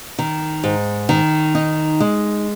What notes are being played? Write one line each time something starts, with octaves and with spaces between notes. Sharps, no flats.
D#3
G#2
D#3
D#4
G#3